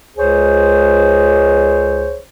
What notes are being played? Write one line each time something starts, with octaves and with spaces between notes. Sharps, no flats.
C#2 G#4 C5 C#5